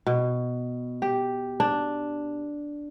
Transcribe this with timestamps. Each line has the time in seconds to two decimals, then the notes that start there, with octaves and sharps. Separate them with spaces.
0.07 B2
1.02 G4
1.60 D4